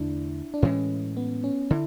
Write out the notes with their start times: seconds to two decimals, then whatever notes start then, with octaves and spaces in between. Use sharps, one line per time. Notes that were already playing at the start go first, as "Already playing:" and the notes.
Already playing: E2 D3 A3 D4 E4
0.54 D4
0.62 A2 E3 G#3 C#4
1.17 B3
1.44 C#4
1.70 D3 E4